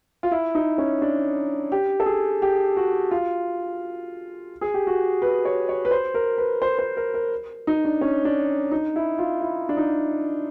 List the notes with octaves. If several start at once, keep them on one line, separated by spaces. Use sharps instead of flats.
F4
E4
D#4
C#4
D4
G4
A4
G#4
G4
F#4
F4
G#4
G4
F#4
B4
C#5
C#5
B4
C5
A#4
B4
C5
C5
A#4
A#4
D#4
D4
C#4
D4
D#4
E4
F4
E4
D4
D#4